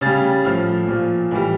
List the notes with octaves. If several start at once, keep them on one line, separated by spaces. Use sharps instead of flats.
C#3 G3 A6
A2 F3 F6
A#2 F3
A2 E3 G3